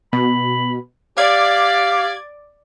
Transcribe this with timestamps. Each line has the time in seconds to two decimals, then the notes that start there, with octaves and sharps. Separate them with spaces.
0.13 B2 B5
1.18 G4 D5 F5 G#6